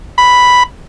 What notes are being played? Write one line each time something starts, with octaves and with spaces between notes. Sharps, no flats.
B5